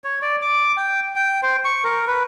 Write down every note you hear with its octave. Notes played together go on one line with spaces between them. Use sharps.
C#5
D5
D6
G5
G5
C5
C#6
A#4
B4